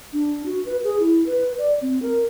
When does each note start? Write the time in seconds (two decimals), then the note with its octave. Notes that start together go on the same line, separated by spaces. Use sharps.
0.13 D4
0.46 F#4
0.66 B4
0.84 G#4
1.00 E4
1.26 B4
1.58 D5
1.81 C4
2.02 A#4